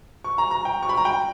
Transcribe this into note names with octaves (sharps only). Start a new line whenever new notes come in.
C#6
A#5
A#5
G5
C#6
B5
A#5
G5